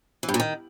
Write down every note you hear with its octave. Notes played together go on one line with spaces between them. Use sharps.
E3
G2
A#2
D#3